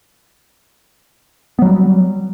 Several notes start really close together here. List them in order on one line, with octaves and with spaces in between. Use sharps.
B3 F#3 G3